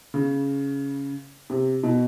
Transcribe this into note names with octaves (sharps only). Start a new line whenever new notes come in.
C#3
C3
B2